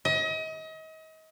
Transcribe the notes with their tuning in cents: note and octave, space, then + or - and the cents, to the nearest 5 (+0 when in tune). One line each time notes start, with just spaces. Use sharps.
D#5 +35